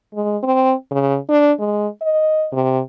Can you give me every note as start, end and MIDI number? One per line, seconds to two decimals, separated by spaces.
0.14 0.37 56
0.43 0.73 60
0.91 1.17 49
1.30 1.51 62
1.59 1.87 56
2.01 2.47 75
2.52 2.80 48